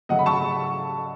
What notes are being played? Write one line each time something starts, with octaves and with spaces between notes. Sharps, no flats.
C#3 F#3 A3 D#5 F#5
B5
A5 C#6